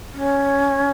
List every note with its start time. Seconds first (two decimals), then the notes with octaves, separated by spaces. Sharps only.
0.15 C#4